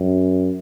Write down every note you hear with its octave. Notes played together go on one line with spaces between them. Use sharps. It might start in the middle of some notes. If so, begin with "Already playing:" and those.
Already playing: F#2